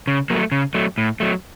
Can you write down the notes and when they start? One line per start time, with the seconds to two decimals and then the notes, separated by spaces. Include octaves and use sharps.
0.07 C#3
0.30 F#3 A3 A#3
0.52 C#3
0.74 F#3 A3
0.98 A2
1.20 F#3 A3